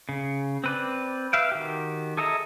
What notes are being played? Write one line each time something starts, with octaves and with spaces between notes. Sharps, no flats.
C#3
C4 B4 D5
B4 E5 F5 G5
D#3 F#4 G4
G#4 A4 D#5 E5 A#5